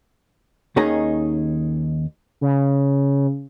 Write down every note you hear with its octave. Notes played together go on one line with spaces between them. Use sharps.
D#2 D#3 C#4 D#4 G#4 A#5
C#3